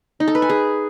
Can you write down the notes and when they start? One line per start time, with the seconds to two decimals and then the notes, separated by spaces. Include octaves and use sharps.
0.20 D#4
0.28 A4
0.35 B4
0.42 G#5
0.49 G#4